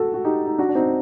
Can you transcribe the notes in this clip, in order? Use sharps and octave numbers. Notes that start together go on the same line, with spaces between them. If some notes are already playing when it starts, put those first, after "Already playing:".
Already playing: F#4 A4
F#4
D#4 G4
D#4
D4 F#4
D4
C4 D#4